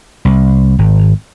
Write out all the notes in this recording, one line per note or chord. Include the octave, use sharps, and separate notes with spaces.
C2
G#1